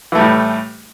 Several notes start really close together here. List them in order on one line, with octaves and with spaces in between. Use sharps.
E3 A3 G3 A2